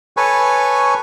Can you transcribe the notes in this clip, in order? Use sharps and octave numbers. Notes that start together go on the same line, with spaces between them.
A4 B4 C#5 G#5 C#6